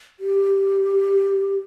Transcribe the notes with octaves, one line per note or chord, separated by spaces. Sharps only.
G4